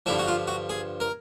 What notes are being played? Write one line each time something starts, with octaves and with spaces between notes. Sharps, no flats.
G2 D3 F3 E4
F#4
F4
F#4
G#4
A#4